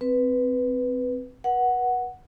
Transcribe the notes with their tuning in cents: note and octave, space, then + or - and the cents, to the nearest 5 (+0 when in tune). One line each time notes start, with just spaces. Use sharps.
C4 -10 B4 +0
B4 -35 F#5 +0